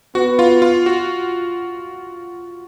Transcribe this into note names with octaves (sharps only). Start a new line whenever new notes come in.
B3 F#4
F4
F4
F#4